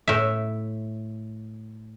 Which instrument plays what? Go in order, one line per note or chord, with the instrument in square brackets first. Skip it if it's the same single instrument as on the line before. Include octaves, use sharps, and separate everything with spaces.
[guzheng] A2 E5